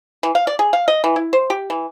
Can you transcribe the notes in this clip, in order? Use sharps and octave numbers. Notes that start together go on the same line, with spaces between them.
E3
F5
D5
G#4
F5
D#5
E3
E4
C5
G4
E3